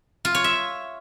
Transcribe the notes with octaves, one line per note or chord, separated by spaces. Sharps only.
F4
C#5
E5